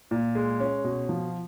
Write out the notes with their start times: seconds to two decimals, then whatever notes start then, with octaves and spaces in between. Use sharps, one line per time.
0.11 A#2
0.35 G#3
0.60 C#4
0.84 B2
1.09 F3